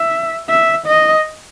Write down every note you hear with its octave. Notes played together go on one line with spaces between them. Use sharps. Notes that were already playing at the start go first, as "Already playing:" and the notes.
Already playing: E5
E5
D#5